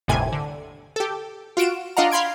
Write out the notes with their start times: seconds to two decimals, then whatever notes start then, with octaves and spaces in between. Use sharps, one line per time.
0.08 G1 D#2 A2 C3 G#5
0.32 D3
0.96 G4 A4
1.57 F4 F#4 D7 E7
1.97 D4 F4 D#5 F5 F#5 A#5
2.12 F5 B5 C6 G#6 D7